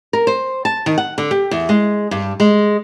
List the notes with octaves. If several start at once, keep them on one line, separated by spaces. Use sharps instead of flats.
A#4
C5
A5
D#3
F#5
D3
G4
E2
G#3
G2
G#3